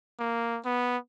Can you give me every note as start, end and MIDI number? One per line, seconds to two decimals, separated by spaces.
0.19 0.59 58
0.65 0.97 59